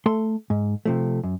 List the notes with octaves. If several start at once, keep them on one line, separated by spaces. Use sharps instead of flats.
A3 A4 C6
G#2
C3 F3 A3
F#2